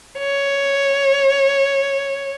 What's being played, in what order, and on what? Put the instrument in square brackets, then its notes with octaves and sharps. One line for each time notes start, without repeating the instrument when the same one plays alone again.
[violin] C#5